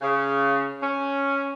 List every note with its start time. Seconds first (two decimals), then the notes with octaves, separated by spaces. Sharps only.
0.02 C#3
0.82 C#4